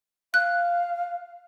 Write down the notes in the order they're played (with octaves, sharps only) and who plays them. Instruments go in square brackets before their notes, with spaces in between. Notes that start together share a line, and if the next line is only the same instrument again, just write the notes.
[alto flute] F5 [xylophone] F#6